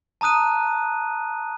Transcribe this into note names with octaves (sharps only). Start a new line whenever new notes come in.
A5 A#5 D#6 F#6 D#7